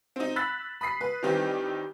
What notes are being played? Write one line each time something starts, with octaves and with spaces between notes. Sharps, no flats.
C4 D#4
B5 E6 F#6 A6 B6
B5 D#6 B6 C7
B4
D#3 E3 G3 C4 D#4 G4